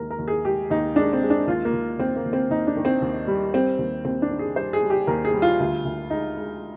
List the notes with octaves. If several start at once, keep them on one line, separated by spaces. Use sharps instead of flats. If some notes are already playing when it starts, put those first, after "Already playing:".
Already playing: D#2 G#3 A#4
A#4
D#2
G#4
G#3 G4
D#2 D#4
G#3 D4
C4
G#3
D4
D#2 F4
A#3
D#2
D#2 C4
A#3
D#2
C4
D#2 D#4
D4
D#3
C4
D#2
G3
G3 C4
D#2
D#2 C4
D4
D#3
G#4
G3 C5
G#4
G3
G4
D#2 A#4
G#4
G3
F4
D2
D2
G#3 D#4
G#3